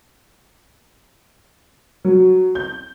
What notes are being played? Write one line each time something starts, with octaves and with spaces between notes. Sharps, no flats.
F#3
G6